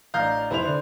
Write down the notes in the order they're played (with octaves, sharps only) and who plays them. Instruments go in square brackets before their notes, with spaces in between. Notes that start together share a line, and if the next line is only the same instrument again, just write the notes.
[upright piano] A1 D4 [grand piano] F5 A#5 G6
[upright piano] F1 E4 [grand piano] C5 F7
[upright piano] D3